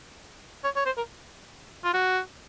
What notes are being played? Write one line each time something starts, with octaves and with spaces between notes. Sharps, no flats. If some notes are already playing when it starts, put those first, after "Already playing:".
C#5
C#5
C5
A#4
F4
F#4